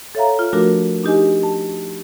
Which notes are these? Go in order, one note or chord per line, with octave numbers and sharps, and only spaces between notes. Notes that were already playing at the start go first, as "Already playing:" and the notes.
A4 C#5 E5 F5 A#5
F4
F3 A3 D4 F#4 A#4
D4 D#4 G4 D#5 G#5
A5